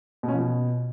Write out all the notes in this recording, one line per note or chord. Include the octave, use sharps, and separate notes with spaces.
B2
C#4
F3
B2